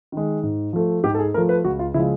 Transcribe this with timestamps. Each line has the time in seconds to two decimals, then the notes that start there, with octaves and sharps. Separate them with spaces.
0.12 D#3 G#3
0.43 G#2
0.73 F3 A3
1.04 G#2 G4
1.15 A4
1.19 G#4
1.34 A3 A#4
1.37 F3
1.49 B4
1.65 C#2 F#4
1.79 F4
1.94 C#3 F3 G#3 E4